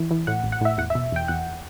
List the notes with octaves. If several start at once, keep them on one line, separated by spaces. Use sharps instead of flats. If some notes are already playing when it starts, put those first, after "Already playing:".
Already playing: E3
E3
A2 F#5
A1
F#5
A2 E5
E2 F#5
E5
B2
E2 G5
E2 F#5